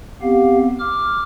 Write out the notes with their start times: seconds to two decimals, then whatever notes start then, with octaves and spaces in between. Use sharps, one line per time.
0.22 B3 C4 G4 F5
0.79 D6 F6